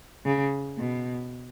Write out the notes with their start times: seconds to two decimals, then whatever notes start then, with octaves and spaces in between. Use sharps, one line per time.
0.26 C#3
0.78 B2